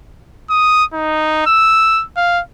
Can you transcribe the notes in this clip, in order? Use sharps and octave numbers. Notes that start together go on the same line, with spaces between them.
D#6
D#4
E6
F5